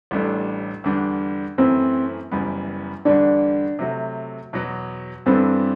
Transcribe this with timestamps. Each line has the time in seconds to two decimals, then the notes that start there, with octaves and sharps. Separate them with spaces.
0.11 A1 A2 G3 D4 A4
0.84 E2 D3 G3 D4
1.58 F#2 E3 A3 C4 E4
2.32 F#1 F#2 E3 G3 B3
3.05 E2 D3 G3 D4
3.79 C3 F#3 A3
4.53 E2 B2 F#3
5.26 G2 E3 B3 C4 D4 A4